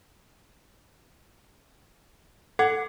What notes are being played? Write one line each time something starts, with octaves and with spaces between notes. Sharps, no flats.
A4 F#5 G#6